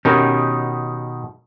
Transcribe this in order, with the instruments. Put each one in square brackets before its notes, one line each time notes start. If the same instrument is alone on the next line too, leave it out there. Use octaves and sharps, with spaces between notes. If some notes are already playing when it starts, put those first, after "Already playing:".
[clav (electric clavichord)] B2 D#3 D#4 [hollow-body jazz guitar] C#4 G4 A#4